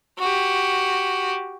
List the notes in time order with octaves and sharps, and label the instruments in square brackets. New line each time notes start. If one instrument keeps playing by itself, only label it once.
[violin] F#4 G4